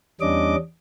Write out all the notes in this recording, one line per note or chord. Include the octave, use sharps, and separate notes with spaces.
E2 G3 C#4 D4 D#5 D6